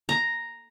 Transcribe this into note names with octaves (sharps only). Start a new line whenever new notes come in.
A#5